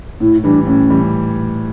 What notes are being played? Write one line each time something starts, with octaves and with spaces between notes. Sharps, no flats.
A2 E4
E3 G3 D4
A2 C#4
E3 G3